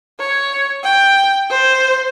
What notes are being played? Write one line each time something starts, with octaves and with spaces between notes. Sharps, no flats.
C#5
G5
C5